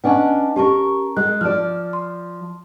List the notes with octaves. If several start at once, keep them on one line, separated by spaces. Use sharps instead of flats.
C#4 D4 B4 D#5 F#5
C#4 G4 A#4 A5 C#6
G#3 F#6
F3 D5 F6
C6